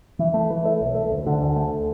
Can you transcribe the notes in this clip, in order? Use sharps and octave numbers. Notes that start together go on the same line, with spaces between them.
E3
A3
E3
A3
B1
A3
D2
D3
D2
A3